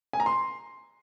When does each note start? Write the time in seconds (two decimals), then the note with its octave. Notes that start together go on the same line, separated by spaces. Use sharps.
0.13 G#5
0.20 A#5
0.26 C6